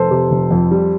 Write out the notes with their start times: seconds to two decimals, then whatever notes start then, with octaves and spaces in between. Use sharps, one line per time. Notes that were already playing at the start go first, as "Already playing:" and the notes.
Already playing: F1 A4 C5
0.11 C3
0.31 F1
0.51 F2
0.71 G3